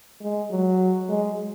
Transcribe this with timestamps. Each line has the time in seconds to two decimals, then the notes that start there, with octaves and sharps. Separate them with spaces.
0.21 G#3
0.51 F#3
1.09 G#3